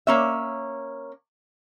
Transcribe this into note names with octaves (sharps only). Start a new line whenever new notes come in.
A#3 C#4 E5